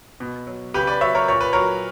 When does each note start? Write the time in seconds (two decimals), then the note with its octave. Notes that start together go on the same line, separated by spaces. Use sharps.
0.20 B2
0.47 F#3
0.74 C#3 G4 B4
0.87 B4 D5
1.01 F#3 C#5 E5
1.15 A#4 C#5
1.28 A#2 C#5
1.41 B4
1.53 F#3 A#4 C#5